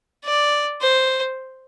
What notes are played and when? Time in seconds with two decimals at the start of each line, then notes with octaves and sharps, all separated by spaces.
0.24 D5
0.81 C5